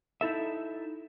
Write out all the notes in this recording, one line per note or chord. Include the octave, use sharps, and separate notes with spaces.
D#4 E4 A4 E5